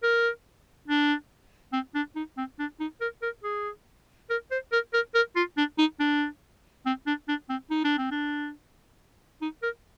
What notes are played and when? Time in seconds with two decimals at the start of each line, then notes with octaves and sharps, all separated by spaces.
0.03 A#4
0.88 D4
1.73 C4
1.95 D4
2.16 D#4
2.38 C4
2.59 D4
2.80 D#4
3.01 A#4
3.23 A#4
3.44 G#4
4.30 A#4
4.51 C5
4.72 A#4
4.94 A#4
5.15 A#4
5.36 F4
5.58 D4
5.79 D#4
6.00 D4
6.86 C4
7.07 D4
7.28 D4
7.50 C4
7.71 D#4
7.85 D4
7.98 C4
8.12 D4
9.42 D#4
9.63 A#4